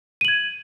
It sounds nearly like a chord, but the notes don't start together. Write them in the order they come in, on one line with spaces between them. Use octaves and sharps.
D#7 F#7 G#6